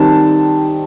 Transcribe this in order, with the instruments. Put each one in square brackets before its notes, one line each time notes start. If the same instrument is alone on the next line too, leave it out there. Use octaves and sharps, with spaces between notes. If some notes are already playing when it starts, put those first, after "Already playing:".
Already playing: [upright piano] D#3 G3 C4 A5